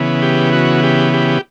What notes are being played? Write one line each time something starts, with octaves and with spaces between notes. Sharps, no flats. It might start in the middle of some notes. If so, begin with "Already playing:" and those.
Already playing: C#3 E3 B3
G4
F#4
G4
G4